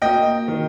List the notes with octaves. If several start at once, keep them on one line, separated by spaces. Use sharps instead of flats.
A#3 D#5 G5
D#3